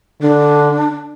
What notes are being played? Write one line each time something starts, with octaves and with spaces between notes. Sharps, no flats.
D3 D4